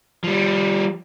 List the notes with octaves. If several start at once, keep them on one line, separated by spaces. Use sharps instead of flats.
F3 G3